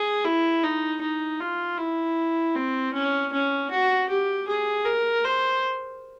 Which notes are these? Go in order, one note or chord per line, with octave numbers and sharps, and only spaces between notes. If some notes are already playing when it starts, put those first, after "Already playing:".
Already playing: G#4
E4
D#4
D#4
F4
E4
C4
C#4
C#4
F#4
G4
G#4
A#4
C5